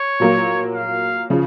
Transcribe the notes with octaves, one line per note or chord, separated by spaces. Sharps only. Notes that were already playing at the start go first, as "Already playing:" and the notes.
Already playing: C#5
A#2 F#3 A#3
F5
C#3 F3